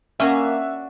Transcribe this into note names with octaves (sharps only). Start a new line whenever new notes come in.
A#3 C#4 D4 F#4 E5 G#5 A#5